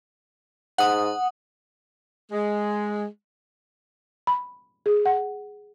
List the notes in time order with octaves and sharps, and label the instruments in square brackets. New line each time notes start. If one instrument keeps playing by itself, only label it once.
[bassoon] G#2 [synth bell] F#5 D#6
[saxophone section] G#3
[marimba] B5
G#4
F#5